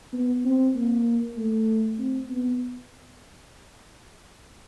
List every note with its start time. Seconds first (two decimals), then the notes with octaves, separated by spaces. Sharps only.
0.13 B3
0.45 C4
0.75 A#3
1.37 A3
1.99 C4
2.30 B3